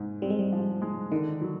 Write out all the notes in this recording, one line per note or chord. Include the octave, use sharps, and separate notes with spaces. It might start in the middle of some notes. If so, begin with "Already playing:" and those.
Already playing: G#2 G#3
G3 C4
G#3
G3
F3
G#3
D3 D#3
F#3